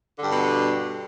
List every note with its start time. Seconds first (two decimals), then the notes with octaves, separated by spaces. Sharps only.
0.19 D3
0.23 G2
0.27 B2